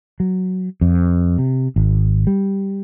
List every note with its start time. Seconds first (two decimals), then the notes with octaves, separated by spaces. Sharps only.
0.20 F#3
0.81 F2
1.38 C3
1.76 G#1
2.27 G3